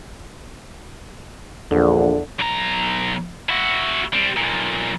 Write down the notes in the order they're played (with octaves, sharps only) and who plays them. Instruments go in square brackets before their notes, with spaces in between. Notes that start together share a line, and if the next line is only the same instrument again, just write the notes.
[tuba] A#1 [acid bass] E2 [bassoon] D3
[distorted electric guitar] B1 A#5
E4 F#4
G3 C4
B1 A#2